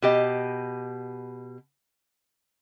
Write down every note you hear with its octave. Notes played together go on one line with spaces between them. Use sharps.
B2 G4 D#5